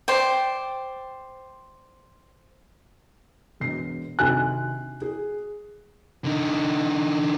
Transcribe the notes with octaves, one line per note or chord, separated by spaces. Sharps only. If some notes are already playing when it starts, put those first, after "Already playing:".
C5 D5 G5
E1 B2 C7
C3 D#3 D4 F#4 G#5 F#6
G#4
D3 D#4